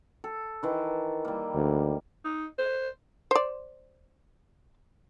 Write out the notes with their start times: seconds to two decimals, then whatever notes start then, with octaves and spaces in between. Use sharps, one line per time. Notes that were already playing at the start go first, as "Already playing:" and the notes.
0.24 A4
0.63 D#3 E3
1.25 G3 A#3
1.55 D2
2.25 D#4
2.58 C5
3.31 C5 D5